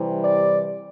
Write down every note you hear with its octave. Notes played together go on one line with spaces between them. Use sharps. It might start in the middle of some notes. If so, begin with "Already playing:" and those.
Already playing: C3 E3 G3
D5